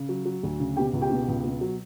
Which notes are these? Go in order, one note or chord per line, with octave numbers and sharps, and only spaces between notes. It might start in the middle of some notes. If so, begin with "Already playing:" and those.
Already playing: C#3
F#3
F#3
D2
C#3
B2 G4 G5
C#2
G4 G5
B2
C#2
B2
F#3